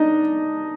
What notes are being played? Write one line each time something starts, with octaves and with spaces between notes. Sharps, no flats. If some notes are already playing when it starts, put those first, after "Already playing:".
Already playing: D4 D#4 D#5